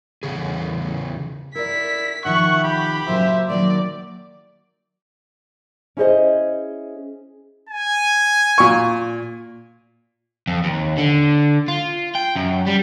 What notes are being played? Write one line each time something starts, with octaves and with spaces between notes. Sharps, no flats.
E2 C#3 G#4
E4 A#4 D5 B6
C3 D#3 F3 E5 F#5 C#6
G4 B5
A#2 C#3 F#3 C5 E5
D#3 F#3 A#3 D5
C#4 E4 G#4 C5 C#5 D#5
G#5
A#2 C#6
F2
D#2
D3
F4
G5
F#2
G3